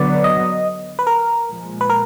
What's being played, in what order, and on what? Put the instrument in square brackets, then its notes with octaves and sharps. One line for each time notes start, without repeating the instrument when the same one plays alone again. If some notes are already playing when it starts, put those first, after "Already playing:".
Already playing: [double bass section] D3 F#3 B3 [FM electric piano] D5
[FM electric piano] D#5
B4
A#4
[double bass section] A#2 F3 G#3
[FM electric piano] B4
A#4